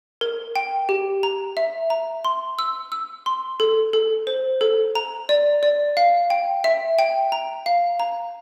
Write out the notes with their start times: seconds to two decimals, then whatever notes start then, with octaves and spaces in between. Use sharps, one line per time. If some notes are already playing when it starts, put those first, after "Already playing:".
0.21 A#4
0.56 G5
0.89 G4
1.23 A#5
1.57 E5
1.90 A#5
2.25 C6
2.59 E6
2.92 E6
3.26 C6
3.60 A4
3.93 A4
4.27 C5
4.61 A4
4.95 A#5
5.29 D5
5.63 D5
5.97 F5
6.30 G5
6.64 E5
6.99 G5
7.32 A#5
7.66 F5
8.00 A#5